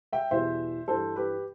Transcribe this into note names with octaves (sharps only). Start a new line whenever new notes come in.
E5 G5
E2 B2 G3 C5 E5
G2 E3 G3 A4 C5
G4 B4